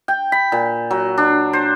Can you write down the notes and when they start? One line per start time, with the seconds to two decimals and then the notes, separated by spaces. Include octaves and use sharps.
0.08 G5
0.32 B5
0.52 A#2
0.91 F#3
1.18 D4
1.53 C5